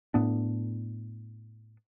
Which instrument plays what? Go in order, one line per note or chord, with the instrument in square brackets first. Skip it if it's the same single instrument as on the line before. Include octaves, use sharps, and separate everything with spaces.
[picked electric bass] A2 B3 D4